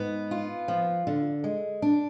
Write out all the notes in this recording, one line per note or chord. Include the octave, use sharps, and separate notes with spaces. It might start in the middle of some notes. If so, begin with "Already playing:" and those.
Already playing: G#2 B3
F4
F3
D3
G#3
D4